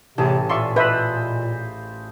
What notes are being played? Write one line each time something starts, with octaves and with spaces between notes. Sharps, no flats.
A1 C3 G3 G#4 A5
A#2 F4 D5 E5 C6 C#6
B4 C5 D#5 E5 B5